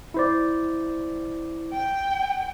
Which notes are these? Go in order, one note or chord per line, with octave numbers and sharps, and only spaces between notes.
E4 C5 D5
G5